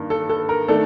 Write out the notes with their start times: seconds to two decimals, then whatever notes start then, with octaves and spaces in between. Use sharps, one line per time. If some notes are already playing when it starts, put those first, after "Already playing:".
Already playing: G2 D#3 A#3
0.10 A4
0.29 A4
0.49 A#4
0.68 D#3 A3 D4 A4